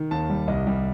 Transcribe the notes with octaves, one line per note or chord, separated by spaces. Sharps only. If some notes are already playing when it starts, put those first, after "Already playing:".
Already playing: D#3
D#2 A5
G3
C2 D#5
G3